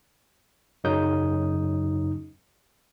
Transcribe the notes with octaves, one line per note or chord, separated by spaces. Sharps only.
F#2 C#3 F#3 D#4 D#6 G6